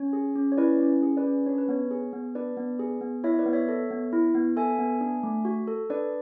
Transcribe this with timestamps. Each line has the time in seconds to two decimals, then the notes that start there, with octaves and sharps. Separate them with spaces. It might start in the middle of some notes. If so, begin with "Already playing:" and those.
Already playing: C#4 C#5
0.13 G#4
0.35 C#4
0.52 C#5
0.57 E4 B4 D5
0.80 C#4
1.02 G#4
1.17 B4 D5
1.24 C#4
1.46 D4 C#5
1.58 B4
1.68 B3 C#5
1.91 G#4
2.13 B3
2.35 D4 B4 D5
2.57 B3
2.79 G#4
3.01 B3
3.24 E4 C#5 E5
3.34 E5
3.39 B4 D5
3.46 B3
3.53 C#5 E5
3.68 A4
3.90 B3
4.13 E4
4.35 B3
4.57 A4 E5 G#5
4.79 B3
5.01 D4
5.23 A3
5.45 F#4
5.67 A4
5.90 D4 B4 D5